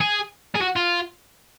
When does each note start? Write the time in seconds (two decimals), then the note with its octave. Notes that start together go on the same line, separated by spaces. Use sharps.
0.01 G#4
0.56 G#4
0.61 F#4
0.76 F4